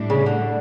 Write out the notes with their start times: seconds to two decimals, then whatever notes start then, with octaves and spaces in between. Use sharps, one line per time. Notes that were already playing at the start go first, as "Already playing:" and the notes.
Already playing: A2 G3 D4
0.10 C#3
0.26 D3